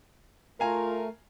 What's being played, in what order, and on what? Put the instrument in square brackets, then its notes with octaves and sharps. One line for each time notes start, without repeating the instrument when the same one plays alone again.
[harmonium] A3 [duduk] F4 [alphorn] A#4 [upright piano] F5 G#5 A#5